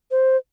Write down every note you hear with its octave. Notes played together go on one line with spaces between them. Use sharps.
C5